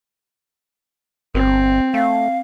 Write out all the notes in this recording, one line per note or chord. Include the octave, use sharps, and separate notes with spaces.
G1 C4
A3 F5